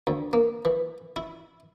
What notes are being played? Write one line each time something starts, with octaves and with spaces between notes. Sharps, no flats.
D2
A#3
E3
E4